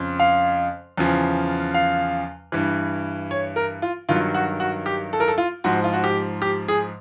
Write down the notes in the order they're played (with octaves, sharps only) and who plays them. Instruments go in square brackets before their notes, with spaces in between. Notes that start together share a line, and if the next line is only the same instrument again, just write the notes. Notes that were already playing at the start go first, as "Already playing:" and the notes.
Already playing: [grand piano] F2 C#3 F3
F5
E2 C#3 F3
F5
G2 E3
C#5
A#4
F4
G2 D#3 F#3 F4
F#4
F#4
G4
A4
A#4
A4
F4
G#2 F3 F#4
F4
F#4
G4
G4
G#4